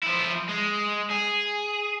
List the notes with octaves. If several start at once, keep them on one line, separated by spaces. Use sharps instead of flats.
F3 E4
G#3
G#4